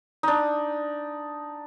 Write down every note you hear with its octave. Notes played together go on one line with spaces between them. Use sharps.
D4 D#4